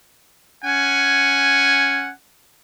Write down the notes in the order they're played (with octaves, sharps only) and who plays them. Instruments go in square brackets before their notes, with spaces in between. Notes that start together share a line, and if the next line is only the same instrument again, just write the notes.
[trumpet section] C#4 F#5 G#5